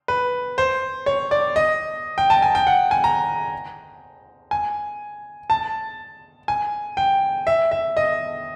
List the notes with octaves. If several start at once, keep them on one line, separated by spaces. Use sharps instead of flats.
B4
C5
C#5
D5
D#5
G5
A5
G#5
G5
F#5
G#5
A#5
G#5
A5
G#5
G5
E5
E5
D#5